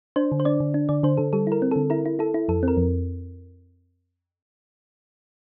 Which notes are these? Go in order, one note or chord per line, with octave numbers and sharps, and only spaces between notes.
D4 C5
D3
C5
D4 D5
D3
D4
D3 D5
D3 C5
D3 A4
G3 A4
E4 A#4
C4
D3 A4
E4 A#4
E4
E4 A4
E4
F2 A4
C4 A#4
F2